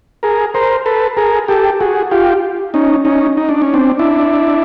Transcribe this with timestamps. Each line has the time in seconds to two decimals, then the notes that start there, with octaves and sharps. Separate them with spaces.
0.23 G#4 A#4
0.54 A#4 C5
0.86 A4 B4
1.17 G#4 A#4
1.48 G4 A4
1.80 F#4 G#4
2.11 F4 G4
2.74 C#4 D#4
3.05 C#4 D#4
3.37 D#4
3.49 D4
3.62 C#4
3.74 C4 D4
3.99 D4 E4